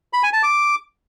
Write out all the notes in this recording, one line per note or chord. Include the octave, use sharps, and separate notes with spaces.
B5
G#5
A5
D6